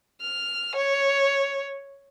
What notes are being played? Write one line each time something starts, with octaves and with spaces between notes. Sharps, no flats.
F6
C#5